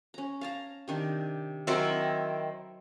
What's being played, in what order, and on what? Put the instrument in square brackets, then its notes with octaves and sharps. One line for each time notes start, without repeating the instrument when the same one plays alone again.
[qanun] C#4 A#5
F5 A5 A#5
C3 D#3 D4
[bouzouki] D#3 C4 E4 [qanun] F#3 G#5